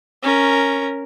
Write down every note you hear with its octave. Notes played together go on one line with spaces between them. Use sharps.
C#4 A#4